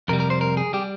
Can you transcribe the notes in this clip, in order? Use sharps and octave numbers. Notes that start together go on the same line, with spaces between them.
F2 C3 G3 A#4
A#4
C5
A#4
G#4
G3 G4